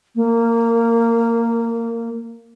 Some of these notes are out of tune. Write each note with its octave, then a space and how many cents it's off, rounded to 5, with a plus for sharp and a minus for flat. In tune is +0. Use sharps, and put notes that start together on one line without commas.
A#3 -15